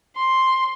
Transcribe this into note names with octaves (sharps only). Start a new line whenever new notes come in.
C6